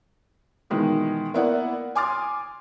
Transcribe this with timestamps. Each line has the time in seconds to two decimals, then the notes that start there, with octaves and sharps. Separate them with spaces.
0.70 B2 D#3 E3 G#3
1.34 A#3 B3 E4 D5 F#5
1.95 G#5 C6 D6 D#6 F6 A6